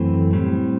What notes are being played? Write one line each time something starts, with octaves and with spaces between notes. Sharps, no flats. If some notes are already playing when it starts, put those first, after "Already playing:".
Already playing: F#2 E3 A3 C4
A2 G3 C4